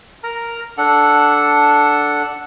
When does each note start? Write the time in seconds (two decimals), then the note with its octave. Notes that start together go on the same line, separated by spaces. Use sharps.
0.23 A#4 A#5
0.78 D4 A4 F#5